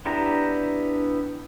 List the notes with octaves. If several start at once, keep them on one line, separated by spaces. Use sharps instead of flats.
B3 D4 E4 G4 A#5